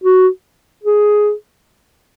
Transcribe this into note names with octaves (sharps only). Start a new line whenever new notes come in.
F#4
G#4